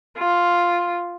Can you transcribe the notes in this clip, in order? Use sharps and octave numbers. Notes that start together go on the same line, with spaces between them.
F4